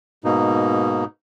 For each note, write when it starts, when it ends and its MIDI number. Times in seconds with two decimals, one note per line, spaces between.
0.24 1.05 44
0.24 1.05 47
0.24 1.05 58
0.24 1.05 63